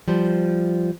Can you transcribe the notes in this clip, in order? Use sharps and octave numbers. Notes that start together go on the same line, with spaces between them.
F3 G3 C5